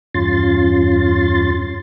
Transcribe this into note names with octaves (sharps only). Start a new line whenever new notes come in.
E2 G2 C#4 F4 C6 A6